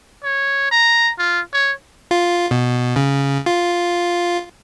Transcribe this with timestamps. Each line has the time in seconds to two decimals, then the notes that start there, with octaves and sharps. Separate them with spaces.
0.24 C#5
0.71 A#5
1.18 F4
1.53 C#5
2.11 F4
2.51 B2
2.96 C#3
3.46 F4